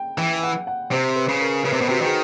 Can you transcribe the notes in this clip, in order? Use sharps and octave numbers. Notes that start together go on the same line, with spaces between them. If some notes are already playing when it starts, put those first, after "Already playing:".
Already playing: G5
E3 G5
F#5
F#5
C3 C5
B4
C#3
A#4
C#3 B4
C3 C5
B2 B4
C3 F#4
D#3 G#4